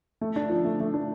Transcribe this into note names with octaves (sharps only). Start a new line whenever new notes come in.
A3
D4
F3
A3
A3
D4